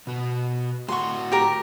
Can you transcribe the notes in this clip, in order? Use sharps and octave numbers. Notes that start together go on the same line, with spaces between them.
B2 F#4
A2 F#4 F#5 C6 C#6
G4 A#4